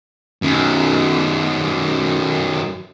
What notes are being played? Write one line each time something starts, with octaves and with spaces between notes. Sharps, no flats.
F#2 D#3